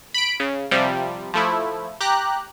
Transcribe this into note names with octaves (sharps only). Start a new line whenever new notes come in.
B5 D7
C#3
C3 F3 G3
F3 A3 E4
G4 A#5 F#6